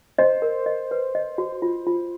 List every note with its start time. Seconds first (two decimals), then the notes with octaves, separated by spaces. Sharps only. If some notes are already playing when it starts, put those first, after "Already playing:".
0.18 C5 D#5
0.42 A#4
0.66 D#5
0.91 B4
1.15 D#5
1.38 F#4
1.62 F4
1.87 F4